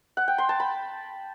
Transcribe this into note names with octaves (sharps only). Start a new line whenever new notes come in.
F#5
G5
C6
A5
B5